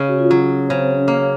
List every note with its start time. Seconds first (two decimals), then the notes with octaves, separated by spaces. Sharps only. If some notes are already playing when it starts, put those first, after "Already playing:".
Already playing: C#3
0.09 F#4
0.19 F4
0.31 F#3
0.69 C#3 C4 C5
0.95 C#4 C#5
1.08 A#3
1.21 C#4 C#5